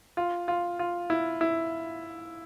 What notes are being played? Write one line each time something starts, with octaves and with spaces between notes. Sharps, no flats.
F4
F4
F4
E4
E4